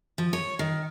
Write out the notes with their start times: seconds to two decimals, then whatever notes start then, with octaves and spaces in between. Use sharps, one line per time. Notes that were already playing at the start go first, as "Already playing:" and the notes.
0.18 F3
0.33 C#5
0.59 D#3